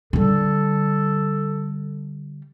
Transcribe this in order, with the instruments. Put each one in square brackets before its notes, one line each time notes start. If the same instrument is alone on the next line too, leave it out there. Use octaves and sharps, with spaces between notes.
[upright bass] D3 G3 [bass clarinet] A4